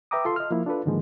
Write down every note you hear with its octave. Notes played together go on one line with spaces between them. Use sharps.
B4 E5 G5 A#5 D6 D#6
F4 A4 C6
D#5 F6
F3 A#3 E4
D4 F4 A4 B4
G#2 D3 D#3 F3 G#3 A#3